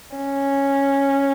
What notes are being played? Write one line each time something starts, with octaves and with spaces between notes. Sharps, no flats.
C#4